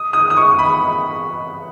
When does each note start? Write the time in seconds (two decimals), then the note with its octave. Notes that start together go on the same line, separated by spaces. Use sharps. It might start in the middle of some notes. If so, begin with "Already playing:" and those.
Already playing: D#6
0.13 D#6
0.30 D#6
0.37 C#6
0.59 B5